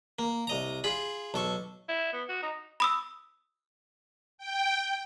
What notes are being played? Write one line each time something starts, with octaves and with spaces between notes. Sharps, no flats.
A#3
C2 D#5 A#5
F4 G#4 B5
B1 A4 C#6
E4
B3
F#4
D#4
B5 D#6 E6
G5